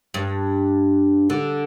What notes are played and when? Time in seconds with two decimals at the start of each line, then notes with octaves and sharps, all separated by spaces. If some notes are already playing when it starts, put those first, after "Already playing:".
0.14 G2
1.30 D3